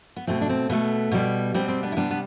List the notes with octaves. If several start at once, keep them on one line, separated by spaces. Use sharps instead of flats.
B3
B2 A3 C4
D4
C4
B2 A3 B3
B2 G3
B2 G3 C4
C4
B3 D4
E4
C3 G3 B3 D4
B3